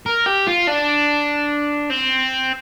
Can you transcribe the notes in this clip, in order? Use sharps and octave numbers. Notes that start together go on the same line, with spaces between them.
A#4
G4
F4
D4
C4